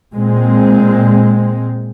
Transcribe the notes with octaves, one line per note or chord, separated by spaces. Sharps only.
A#2 G#3 C4